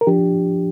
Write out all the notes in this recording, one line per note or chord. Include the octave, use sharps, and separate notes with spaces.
A#4
F3 D4 G4